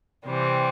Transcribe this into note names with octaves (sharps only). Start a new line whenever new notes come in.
C3 E3 G3 C4